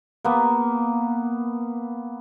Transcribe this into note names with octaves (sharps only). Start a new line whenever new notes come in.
A#3 B3